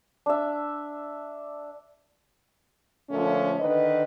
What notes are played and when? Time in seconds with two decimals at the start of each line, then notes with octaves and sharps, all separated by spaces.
0.26 D4 E5
3.10 A#2 D3 F3 A3 C#4
3.59 D3 D#3 B4 D#5